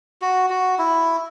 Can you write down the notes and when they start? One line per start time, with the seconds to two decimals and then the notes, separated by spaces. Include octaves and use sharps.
0.22 F#4
0.50 F#4
0.79 E4